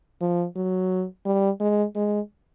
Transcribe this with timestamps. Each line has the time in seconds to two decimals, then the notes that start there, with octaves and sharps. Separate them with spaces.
0.21 F3
0.56 F#3
1.26 G3
1.60 G#3
1.95 G#3